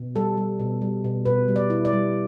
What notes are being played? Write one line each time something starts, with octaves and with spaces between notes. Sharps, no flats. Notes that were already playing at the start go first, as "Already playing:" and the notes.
Already playing: B2
G3 A4
G3
B2
G3
B2
B2 B4
G3
D5
E4
D5
G3